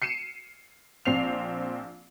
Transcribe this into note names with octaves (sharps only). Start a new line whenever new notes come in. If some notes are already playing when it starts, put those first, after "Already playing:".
C7 C#7 D#7 E7
A#1 C4 C7 F7